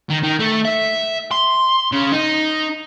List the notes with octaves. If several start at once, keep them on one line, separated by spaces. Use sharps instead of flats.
D#3
D#3
A3
E5
C6
C#3
D#4